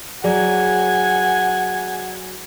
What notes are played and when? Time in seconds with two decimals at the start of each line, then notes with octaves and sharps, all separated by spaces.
0.24 F#3 G#4 D5 F#5 G#5